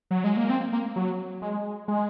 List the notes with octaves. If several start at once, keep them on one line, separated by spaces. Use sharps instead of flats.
F#3
G#3
A#3
C4
A#3
F#3
G#3
G#3